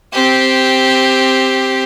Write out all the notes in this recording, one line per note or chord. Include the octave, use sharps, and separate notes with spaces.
C4 G4